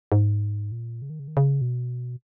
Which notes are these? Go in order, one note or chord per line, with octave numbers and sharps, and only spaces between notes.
G#2
A#2
C#3
D#3
C#3
D#3
C#3
B2